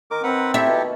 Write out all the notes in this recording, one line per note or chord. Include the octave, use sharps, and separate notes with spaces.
D#3 A#4 D6
C4 A#4 B4 F#5
E4 G4 A4 E5
B2